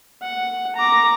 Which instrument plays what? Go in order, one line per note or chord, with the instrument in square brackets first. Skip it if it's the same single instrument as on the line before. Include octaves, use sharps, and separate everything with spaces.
[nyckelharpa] F#5
A#5 D6